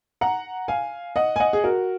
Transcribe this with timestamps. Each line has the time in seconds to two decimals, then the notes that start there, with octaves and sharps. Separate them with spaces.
0.21 F#5 A#5
0.68 F5 G#5
1.16 D#5 F#5
1.36 G#5
1.40 D#5 F#5
1.53 G#4
1.64 F#4 A#4